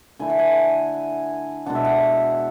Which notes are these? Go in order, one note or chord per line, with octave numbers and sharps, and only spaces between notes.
D3 A3 E4 G#5
F#5
G#5
B2 G#3 D4 F#5
E5
F#5